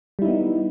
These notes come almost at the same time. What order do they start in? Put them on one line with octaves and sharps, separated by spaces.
G3 E4 D#4 B3